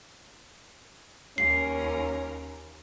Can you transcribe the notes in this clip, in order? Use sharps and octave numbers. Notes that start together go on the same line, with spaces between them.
D#2 C#4 A#4 C7